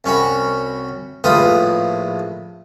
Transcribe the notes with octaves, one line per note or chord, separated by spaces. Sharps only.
C2 C#4 F#4 B5
A#1 A2 F4 B4 D#6